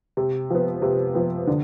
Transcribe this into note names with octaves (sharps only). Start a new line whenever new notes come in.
C3
F3 B3
C3
F3 B3
D3